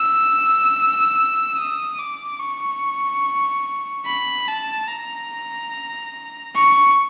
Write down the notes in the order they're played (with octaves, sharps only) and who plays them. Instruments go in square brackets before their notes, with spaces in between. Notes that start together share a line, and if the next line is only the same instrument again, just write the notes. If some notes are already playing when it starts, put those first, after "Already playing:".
Already playing: [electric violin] E6
D#6
D6
C#6
B5
A5
A#5
C#6